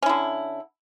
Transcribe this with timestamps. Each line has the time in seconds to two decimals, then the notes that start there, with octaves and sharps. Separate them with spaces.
0.02 C#4
0.06 E4
0.09 D3